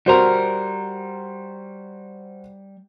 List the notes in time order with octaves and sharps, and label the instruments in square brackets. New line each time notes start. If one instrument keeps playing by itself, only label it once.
[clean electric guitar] G3 A#4 [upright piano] F#4 C5